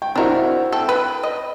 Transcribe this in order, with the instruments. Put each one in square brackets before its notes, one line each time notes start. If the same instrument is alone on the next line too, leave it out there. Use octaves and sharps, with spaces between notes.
[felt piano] G5
[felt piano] C4 E4 F#4 [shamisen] D4 A#4
[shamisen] A4 [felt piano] G5
[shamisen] B4
D#5